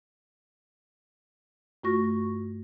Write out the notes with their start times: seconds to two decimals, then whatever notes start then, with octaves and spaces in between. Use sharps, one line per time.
1.84 G2 A3 F4 F#4 C#6 A#6